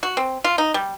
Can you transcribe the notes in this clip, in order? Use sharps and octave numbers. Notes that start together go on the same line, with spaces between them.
F#4
C4
F4
D#4
G3